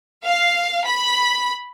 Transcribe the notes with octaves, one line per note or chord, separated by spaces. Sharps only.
F5
B5